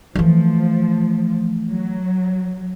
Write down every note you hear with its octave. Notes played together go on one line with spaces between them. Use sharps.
E3 F3 A3
F#3